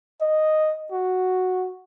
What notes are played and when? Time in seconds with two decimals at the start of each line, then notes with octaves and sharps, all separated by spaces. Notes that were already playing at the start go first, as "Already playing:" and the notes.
0.21 D#5
0.92 F#4